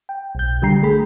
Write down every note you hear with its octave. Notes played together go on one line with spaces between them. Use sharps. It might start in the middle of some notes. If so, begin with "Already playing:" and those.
G5
B1 G6
D3 G3 D4 G5 A#5 C7
A3 G#4 B5